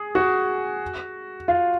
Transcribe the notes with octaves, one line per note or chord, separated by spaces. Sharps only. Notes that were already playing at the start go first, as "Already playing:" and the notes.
Already playing: G#4
F#4
F4